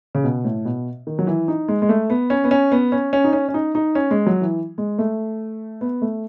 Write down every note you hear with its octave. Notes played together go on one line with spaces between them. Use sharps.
C#3
B2
A2
B2
D#3
F#3
E3
D#4
G#3
G#3
A3
B3
C#4
B3
C#4
B3
C#4
C#4
D#4
C#4
C#4
D#4
D#4
C#4
G#3
F#3
E3
G#3
A3
B3
A3